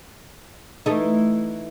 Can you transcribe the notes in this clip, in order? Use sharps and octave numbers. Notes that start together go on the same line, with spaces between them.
E3 A3 D#4